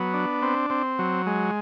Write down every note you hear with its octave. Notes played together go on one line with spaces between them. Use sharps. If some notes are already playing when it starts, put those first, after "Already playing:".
Already playing: F#3 B3
D4
C4
C4
F#3
G#3